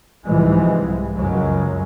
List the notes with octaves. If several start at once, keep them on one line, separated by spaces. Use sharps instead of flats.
C2 G#2 E3 F3 G#3
C#2 F#2 C#3 F#3 G#3